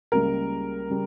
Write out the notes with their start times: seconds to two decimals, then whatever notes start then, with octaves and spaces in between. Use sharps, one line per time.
0.12 C#2 C#3 G3 A#3 A#4
0.90 C#3 G3